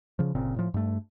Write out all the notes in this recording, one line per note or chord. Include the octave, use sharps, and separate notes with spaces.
C#3 F3
G1 A#2 C#3 C4
A2 F3
G2 A3